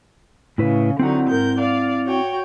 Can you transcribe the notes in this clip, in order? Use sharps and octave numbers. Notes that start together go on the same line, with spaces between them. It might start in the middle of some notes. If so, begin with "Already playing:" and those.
A2 C#3 E4 B4
D3 F#3 C4 D#4 E4 F#5
G#2 A#4 G6
D5 F5
F#4 C#5 G5